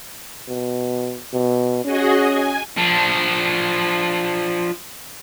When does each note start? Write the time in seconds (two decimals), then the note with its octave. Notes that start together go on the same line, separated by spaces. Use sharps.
0.48 B2
1.33 B2
1.85 C#4 F#4 G#4 D#5
2.28 G#5
2.77 F3 D4